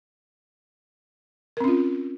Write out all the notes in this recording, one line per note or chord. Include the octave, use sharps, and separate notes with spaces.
C4 C#4 F4 A#4